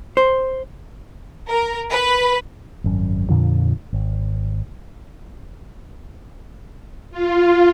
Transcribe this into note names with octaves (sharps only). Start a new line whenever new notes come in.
C5
A#4
B4
G#1 F#2
F2 A#2 D3 F3
G#1
F4